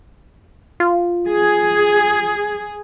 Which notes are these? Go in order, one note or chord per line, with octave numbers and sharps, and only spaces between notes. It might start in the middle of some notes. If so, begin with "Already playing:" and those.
F4
G#4